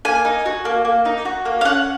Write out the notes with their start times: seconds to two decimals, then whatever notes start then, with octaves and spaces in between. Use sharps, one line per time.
0.05 A#3 G#5
0.25 D#4
0.46 F#4
0.65 A#3
0.85 A#3
1.05 D#4
1.25 F#4
1.45 A#3
1.61 F5
1.65 C#4 F#5